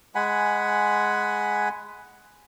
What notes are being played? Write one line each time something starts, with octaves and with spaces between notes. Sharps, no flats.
G#3 F#5 G#5 B5